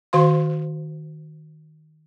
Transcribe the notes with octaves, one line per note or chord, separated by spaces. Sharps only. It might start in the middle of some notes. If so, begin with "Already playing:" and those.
D#3 F#4 C5 F5 C6